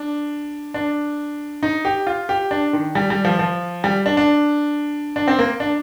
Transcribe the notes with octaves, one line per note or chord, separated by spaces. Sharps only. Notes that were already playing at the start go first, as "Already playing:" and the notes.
Already playing: D4
D4
D#4
G4
F4
G4
D4
D#3
G3
G3
F3
F3
G3
D4
D4
D4
C4
A#3
D4